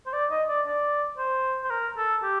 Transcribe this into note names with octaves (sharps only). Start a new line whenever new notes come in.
C5
D5
D#5
D5
D5
C5
C5
A#4
A4
G4